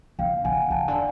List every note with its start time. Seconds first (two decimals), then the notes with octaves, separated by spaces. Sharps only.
0.19 C#3 F5 G5
0.45 C#3 F#5 G#5
0.70 C#3 G5 A5
0.88 D3